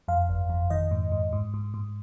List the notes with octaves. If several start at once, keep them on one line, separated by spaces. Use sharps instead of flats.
F2 F5
G1
F2
D#3 D#5
G#2
G#2
G#2
G#2
G#2